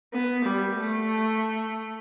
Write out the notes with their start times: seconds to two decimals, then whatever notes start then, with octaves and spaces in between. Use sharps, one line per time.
0.14 B3
0.45 G3
0.76 A3